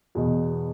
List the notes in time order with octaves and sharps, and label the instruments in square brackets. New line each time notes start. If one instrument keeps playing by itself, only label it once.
[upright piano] E2 B2